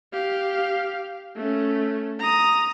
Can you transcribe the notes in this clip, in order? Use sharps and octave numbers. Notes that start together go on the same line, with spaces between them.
G4 F5
A3 C#4
A#5 D#6